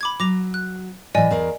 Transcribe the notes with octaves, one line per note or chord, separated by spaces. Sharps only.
B5 D6 G#6
F#3 D6 A#6 F7
F#6
A2 E3 D5 D#5 G#5
E2 A#4 F5